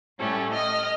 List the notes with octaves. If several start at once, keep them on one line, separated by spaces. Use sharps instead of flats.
A2 G3 A3 C#4
D#5 D#6 F6